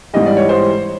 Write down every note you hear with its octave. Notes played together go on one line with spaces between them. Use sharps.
G#2 E3 G3 D#5
D5
C#5
C5